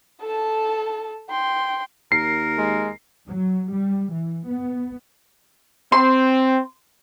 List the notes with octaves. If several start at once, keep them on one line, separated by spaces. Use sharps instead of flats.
A4 A5
G5 C6
D#2 A#4 C7
G#3
F#3
G3
E3
B3
C4 C6